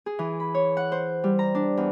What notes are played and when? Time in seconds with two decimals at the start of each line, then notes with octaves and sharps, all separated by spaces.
0.06 G#4
0.19 E3
0.40 B5
0.54 C#5
0.77 F#5
0.92 C5
1.24 G3
1.39 A#5
1.55 D4
1.77 E2